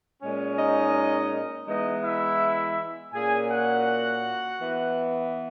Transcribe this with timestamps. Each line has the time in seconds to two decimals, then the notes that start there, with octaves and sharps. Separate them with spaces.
0.22 A#2 G#3 C#4
0.58 D#4 D#5
1.67 E3 G#3 B3 D#4 D#5
2.03 E4 E5
3.13 A#2 A#3 C#4 G#4 G#5
3.49 F#4 F#5
4.59 E3 B3